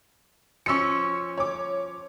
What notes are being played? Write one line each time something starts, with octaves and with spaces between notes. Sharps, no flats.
F3 C#4 C#6 E6 C#7
C#5 D6